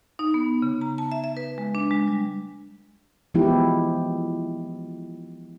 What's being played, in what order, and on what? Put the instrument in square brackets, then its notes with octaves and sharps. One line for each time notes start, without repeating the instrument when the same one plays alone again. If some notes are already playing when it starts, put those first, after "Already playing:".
[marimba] D#4
B3
C#3
A#5
A5
E5
E5
B4
G#3
D4
G#3
G3
[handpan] E3 F3 G#3 B3 E4 G4